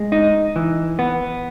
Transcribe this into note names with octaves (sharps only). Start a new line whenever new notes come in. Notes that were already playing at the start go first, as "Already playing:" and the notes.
Already playing: G#3
D#4
E3
B3